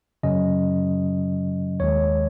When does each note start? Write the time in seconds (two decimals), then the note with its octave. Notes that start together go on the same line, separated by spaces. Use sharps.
0.23 F#2 C#3 F#3 C#4 D#5
1.80 D#2 D#3 G#3 C#5